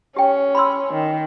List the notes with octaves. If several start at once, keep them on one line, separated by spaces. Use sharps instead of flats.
C#4 G4 G5
B5 C6 E6
D#3